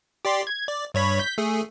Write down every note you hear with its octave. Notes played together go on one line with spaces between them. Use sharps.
G4 D5 C6
G#6
D5
G2 C#5 B5
G6 B6
A3 G#4